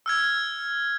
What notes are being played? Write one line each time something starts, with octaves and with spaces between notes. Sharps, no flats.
E6 F6 G#6